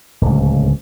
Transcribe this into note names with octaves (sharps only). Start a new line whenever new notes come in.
D1 C#2